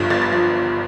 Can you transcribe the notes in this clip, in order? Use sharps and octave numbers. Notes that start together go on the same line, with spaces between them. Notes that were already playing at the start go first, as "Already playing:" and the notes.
Already playing: G1 G2 F3
G1 A6
A6
F3